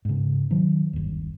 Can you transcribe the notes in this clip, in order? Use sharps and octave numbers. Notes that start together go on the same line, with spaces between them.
G#2 C#3
D#3 F#3
G1 D#2